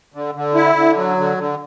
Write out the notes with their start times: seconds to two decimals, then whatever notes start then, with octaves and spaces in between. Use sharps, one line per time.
0.14 D3
0.35 D3
0.55 E4
0.76 D3
0.96 F#3
1.17 D3
1.37 D3